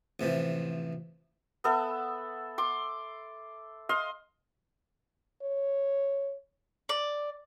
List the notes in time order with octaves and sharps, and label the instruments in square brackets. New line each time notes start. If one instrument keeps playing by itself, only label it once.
[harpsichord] A1 C3 E3 F3
[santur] B3 A4 E5
C6 D6
D#5 F5 C6
[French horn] C#5
[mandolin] D5